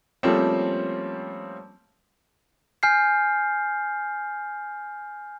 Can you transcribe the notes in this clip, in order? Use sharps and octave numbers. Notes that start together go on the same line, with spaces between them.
F3 G3 A3 A#3 C4 C#4
G#5 F6 G6 C7